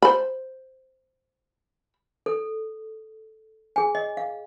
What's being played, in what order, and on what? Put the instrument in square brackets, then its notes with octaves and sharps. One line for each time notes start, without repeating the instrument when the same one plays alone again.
[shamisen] C5 B5
[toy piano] A4
G#4 G#5
D#5
F5